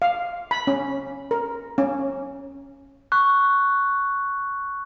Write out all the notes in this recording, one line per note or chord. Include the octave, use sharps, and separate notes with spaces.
F5
B5
C#4
A#4
C#4
C#6 F#6